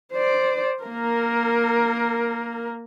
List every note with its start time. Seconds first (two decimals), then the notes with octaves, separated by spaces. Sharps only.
0.13 C5 D5
0.84 A#3 A#4